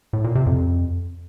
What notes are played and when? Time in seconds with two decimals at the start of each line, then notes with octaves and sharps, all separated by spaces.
0.13 A2
0.24 A#2
0.35 C3
0.46 F2